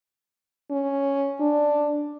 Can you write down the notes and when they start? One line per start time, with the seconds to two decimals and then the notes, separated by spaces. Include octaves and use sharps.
0.71 C#4
1.40 D4